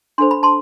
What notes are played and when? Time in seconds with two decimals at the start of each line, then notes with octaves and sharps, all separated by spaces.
0.18 D4 A4 C5 C6
0.31 B5
0.43 A5 C6